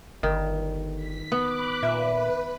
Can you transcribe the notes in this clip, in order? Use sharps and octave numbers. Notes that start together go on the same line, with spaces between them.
G1 D#3
B6
B3 B5 D6 F#6
A#2 B4 E5